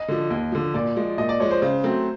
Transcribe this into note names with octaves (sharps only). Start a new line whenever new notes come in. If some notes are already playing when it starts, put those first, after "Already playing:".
Already playing: D#5
D3 F3
D#2
D3 F3
A#2 D5
F3 G#3
A#2 D#5
D5
F3 G#3 C#5
C5
C#3
F#3 A3 C4